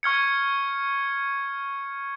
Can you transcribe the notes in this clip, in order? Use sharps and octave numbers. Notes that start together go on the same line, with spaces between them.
C#6 F6 G#6 C#7